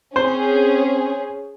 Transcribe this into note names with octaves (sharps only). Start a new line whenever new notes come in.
C4 C#4 G#4 C5